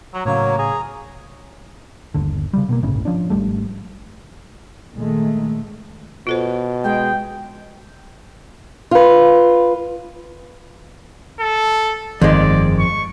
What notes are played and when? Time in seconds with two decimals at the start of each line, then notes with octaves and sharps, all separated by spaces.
0.14 F#3 A#5
0.25 A2 C#3 F#3 A#3 C#5 F5
0.59 G#4 A#5
2.14 G1 D#2 D3
2.53 C#3 E3 G3
2.69 B2 G#3 A#3
2.83 G1 C2 A2 C#3
3.05 F3 C#4 D4
3.30 G#1 E2 G3 A3
4.93 A#2 D#3 G#3 A3
6.27 B2 F4 A4 C5
6.84 G#3 G5
8.91 F4 B4
11.40 A4
12.21 G1 F2 D#3 G#3 D5
12.79 C#6